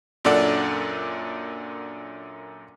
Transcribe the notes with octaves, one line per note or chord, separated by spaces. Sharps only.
F#2 A#2 D4 A4 D5 F#5